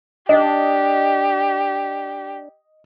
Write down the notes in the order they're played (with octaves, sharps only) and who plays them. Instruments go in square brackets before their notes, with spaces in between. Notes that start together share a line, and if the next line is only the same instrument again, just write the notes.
[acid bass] D4 [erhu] G4 [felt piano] D#5